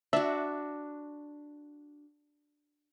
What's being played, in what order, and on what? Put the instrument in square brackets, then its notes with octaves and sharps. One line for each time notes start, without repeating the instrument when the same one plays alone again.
[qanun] D4 F#4 [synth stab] E5